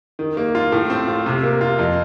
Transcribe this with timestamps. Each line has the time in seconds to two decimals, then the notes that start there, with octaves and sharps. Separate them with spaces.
0.19 D#3
0.37 A#3
0.55 F4
0.72 A2
0.90 C4
1.08 F4
1.26 C3
1.43 A#3
1.61 F4
1.79 F2